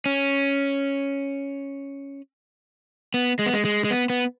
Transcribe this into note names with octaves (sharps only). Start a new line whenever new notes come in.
C#4
B3
G#3
B3
G#3
G#3
G#3
B3
B3